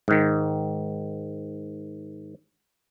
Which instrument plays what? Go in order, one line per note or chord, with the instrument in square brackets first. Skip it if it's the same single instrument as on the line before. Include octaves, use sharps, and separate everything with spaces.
[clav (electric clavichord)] G#2 D#3